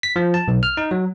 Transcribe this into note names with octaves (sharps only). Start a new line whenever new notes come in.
B6
F3
A5
B1
F6
D#4
F#3